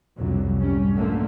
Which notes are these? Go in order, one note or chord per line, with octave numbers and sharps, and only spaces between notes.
C2 F2 D3 F#3
G#2 G3 C#4
G#2 B2 D3 F3 A3 A#3